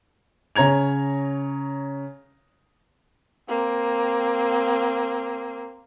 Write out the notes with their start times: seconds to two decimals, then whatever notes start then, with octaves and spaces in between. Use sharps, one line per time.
0.56 C#3 C#5 A#5 G#6 F7
3.48 A#3 C4